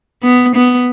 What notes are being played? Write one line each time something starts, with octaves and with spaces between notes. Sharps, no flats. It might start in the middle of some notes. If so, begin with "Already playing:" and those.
B3
B3